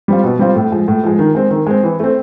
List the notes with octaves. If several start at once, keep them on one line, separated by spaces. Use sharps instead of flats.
G3 C4 F4
B2
G3 C4 F4
A2
F3 G#3
A2
F3 G#3
D#3
G#3 C4
D#3
G#3 C4
E3
A3 C4